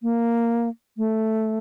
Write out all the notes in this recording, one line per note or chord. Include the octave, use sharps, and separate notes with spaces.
A#3
A3